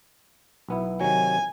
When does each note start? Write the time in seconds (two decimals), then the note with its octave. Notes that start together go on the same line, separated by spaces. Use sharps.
0.69 B1 B3 E4
1.01 C3 D#3 F#3 G#5